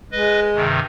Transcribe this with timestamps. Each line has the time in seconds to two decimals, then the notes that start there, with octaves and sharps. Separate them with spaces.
0.12 G#3 B4 D#5
0.54 G2 C3 D#3